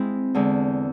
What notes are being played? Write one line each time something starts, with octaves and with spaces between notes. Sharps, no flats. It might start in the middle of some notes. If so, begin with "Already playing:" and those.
Already playing: G#3 C4 E4
E2 D3 G#3